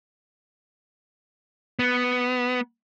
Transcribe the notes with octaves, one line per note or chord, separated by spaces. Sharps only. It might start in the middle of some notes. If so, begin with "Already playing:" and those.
B3